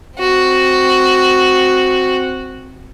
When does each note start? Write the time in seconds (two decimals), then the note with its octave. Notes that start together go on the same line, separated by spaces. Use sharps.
0.19 C4 F#4